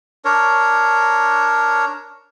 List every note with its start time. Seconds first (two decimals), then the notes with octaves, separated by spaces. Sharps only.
0.25 D4 A#4 C#5